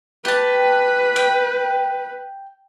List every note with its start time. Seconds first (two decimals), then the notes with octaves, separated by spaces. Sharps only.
0.25 G4 B4 A5
1.16 G5